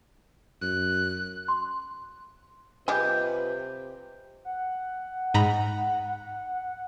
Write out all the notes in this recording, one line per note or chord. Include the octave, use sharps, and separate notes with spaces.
F#2 F#6
C6
C3 G3 F4 G4 G#4 B4 D#5 G6
F#5
G#2 A#5 B5